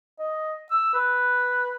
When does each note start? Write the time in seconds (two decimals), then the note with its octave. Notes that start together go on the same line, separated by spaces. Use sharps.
0.19 D#5
0.71 E6
0.94 B4